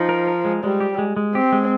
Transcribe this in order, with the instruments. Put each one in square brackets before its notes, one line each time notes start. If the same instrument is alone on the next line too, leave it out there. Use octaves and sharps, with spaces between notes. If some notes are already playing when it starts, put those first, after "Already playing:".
Already playing: [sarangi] F3 [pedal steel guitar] D#4
[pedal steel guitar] A#4
A#4
G#3
[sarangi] G3 [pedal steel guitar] G#3
[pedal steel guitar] G4
G#3
G#3
[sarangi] C4 [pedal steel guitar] G4
[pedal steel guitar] G#3